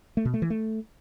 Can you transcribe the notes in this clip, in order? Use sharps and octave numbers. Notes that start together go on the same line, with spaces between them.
A3
B2
A3
E3
A3